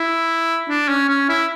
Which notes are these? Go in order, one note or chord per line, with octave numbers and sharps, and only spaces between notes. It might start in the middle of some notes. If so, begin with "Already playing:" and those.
Already playing: E4
D4
C#4
C#4
E4